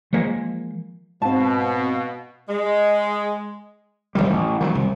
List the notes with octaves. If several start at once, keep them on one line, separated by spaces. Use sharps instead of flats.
E3 F3 G#3 A#3
G#2 B2 C4 F5 A5
G#3
D#1 B1 D#3 G3
A1
D#3 E3 F#3
C2